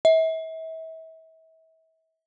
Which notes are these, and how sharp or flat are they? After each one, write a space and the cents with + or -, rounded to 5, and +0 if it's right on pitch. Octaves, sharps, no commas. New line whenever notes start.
E5 -35